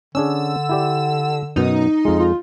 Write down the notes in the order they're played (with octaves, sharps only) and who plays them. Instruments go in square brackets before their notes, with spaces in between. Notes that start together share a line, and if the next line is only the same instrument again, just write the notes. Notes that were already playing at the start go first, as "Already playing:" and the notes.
[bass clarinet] D3 [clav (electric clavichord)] C#4 D4 G#4 [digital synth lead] E6
[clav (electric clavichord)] E4 G4 D5
[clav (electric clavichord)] F#2 B2 [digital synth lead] D#4
[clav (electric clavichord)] F2 G#3 [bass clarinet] F4
[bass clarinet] F4